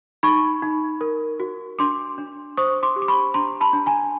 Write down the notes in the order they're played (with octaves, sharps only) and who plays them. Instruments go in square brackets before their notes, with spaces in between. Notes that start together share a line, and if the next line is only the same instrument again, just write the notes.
[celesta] D#4 B5 C#6
D#4
A#4
F#4
D4 C6 D6
D4
C5 C#6 D#6
C6 D6
G4
D6
B5 C#6
D4 A#5 C6
A5 B5
D4
G#5 A#5